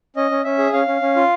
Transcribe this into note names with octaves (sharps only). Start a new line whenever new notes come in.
C#4 D#5
C#4
C#4 E5
G#4
C#4 F5
C#4
C#4
F4